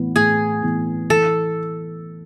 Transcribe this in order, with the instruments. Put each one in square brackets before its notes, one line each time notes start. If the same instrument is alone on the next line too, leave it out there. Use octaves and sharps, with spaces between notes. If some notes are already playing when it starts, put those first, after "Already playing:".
Already playing: [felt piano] A2 E3 B3
[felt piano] A2 [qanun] G#4
[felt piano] E3 B3
[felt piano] E3 [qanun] A4